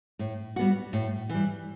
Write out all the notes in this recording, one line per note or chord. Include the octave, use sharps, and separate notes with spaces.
A2
G3 B3 F#4
A2
E3 G3